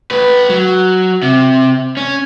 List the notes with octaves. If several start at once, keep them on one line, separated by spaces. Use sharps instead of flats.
A3 B4
F#3
C3
C#4